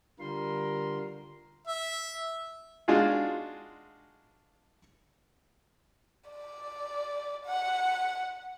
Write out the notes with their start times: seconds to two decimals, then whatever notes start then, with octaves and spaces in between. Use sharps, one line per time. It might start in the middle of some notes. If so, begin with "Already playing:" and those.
0.20 D3 G3 F4 A#4 C6
1.67 E5
2.88 G#3 D4 D#4 F4 F#4 G#4
6.30 D5
7.46 F#5